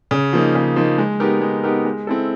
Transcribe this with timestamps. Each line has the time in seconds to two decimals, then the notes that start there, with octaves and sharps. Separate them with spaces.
0.11 C#3
0.33 F3 A#3 D#4
0.55 C#3
0.76 F3 A#3 D#4
0.98 G#3
1.20 B3 D#4 G4 A#4
1.41 G#3
1.63 B3 D#4 G4 A#4
1.85 G#3
2.07 C4 E4 A4